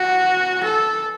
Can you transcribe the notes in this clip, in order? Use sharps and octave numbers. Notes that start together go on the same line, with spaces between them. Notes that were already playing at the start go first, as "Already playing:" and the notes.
Already playing: F#4
A4